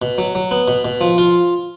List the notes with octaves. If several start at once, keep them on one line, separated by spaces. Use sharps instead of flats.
B2
F#3
F#3
B3
B2
B2
F3
F4